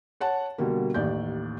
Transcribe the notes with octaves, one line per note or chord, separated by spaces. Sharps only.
C#5 F#5 A5
B2 D3 G3 A#3
A1 D#2 D5 G6